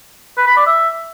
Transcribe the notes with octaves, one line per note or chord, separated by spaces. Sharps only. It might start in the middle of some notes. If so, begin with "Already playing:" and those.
B4
B5
D5
E5